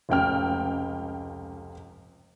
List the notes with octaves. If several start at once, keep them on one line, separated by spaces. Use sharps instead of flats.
F1 C#2 G5 F6